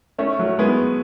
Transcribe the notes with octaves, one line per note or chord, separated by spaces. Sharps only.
A3 C#4
F#3 A3
G#3 B3